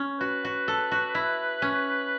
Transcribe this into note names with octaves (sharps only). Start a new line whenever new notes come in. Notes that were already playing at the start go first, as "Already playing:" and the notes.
Already playing: C#4
F#4 B4
F#4
A4
F#4
E4
C#4